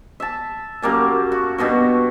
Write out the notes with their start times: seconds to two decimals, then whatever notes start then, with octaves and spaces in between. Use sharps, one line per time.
0.20 E5 A5
0.82 F#2 G3 A#3 A5
1.32 F#4
1.58 G2 B2 B3 F#4